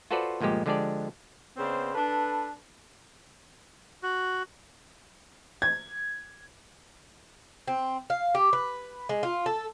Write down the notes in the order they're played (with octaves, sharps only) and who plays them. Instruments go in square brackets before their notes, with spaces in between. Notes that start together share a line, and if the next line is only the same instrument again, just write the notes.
[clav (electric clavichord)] F4 F#4 A4 B4 C5 D5
G1 A#2 F3 G#3 G4
D3 F3 G#3 D4 G4 D5
[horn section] C#3 B3 C4 C5 D5
D4 A4 B4
[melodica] F#4
[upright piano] G#6
[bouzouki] C4
F5
G4
B4
G#3
F4
A4